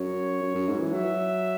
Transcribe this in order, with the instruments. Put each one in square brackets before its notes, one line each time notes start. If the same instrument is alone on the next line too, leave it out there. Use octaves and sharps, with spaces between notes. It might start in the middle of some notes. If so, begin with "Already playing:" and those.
Already playing: [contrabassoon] F#2 [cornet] C#5
[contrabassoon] F#2
F#2
G#2
E3
[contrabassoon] F#3 [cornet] E5